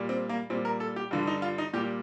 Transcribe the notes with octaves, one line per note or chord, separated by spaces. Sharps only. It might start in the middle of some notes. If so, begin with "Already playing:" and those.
Already playing: A#2 G3
C4
A#3
A#2 G3 C4
A#4
A4
G4
G2 D3 G3 F4
D#4
F4
D#4
A#2 G3 G4